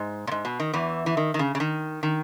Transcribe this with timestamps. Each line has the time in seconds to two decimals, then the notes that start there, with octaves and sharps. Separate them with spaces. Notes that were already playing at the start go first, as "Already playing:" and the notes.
Already playing: G#2
0.27 A#2
0.31 G#2
0.45 B2
0.60 D#3
0.73 E2 E3
1.06 E3
1.17 D#3
1.34 D#3
1.39 C#3
1.55 C#3
1.60 D#3
2.03 D#3